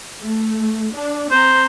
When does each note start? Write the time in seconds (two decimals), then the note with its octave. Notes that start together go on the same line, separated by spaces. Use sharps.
0.22 A3
0.94 D4
1.31 C4 C5 A#5